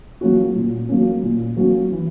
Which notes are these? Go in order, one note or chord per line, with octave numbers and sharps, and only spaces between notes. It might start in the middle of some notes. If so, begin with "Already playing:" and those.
F#3 A#3 C#4 F#4
A#2
F#3 A#3 C#4
A#2
F#3 A#3 C#4
E3